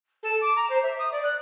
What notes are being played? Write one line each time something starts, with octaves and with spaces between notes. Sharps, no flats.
A4
D6
A#5
C5
E5
D#6
D5
F#6